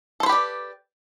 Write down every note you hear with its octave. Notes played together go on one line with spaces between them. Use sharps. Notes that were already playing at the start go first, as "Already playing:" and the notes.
G4 A4 B4 C5 D5